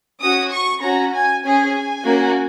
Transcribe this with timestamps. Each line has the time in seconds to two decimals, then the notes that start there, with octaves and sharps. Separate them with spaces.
0.20 C#4 F#4 D#6
0.51 C#6
0.81 C#4 F#4 A#5
1.13 G#5
1.43 C#4 G#4 G#5
2.05 A#3 C#4 F#4